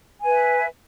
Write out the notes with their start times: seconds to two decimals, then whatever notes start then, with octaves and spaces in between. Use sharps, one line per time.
0.19 G#5
0.24 B4
0.28 E5